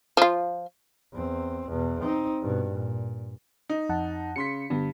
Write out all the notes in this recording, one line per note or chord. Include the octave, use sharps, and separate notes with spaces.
F3 F4
E2 C4
E2 B2
C4 D#4
G2 B2
A#2
D#4
F2 F#5 A5
C#3 C6 B6 C#7
G2 D3 B3 D4